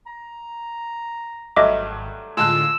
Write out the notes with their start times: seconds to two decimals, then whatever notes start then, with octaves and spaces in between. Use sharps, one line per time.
0.06 A#5
1.56 G#1 G2 F#3 A3 D#5 E5 D6
2.37 A2 D3 G#3 F4 A5 E6 F#6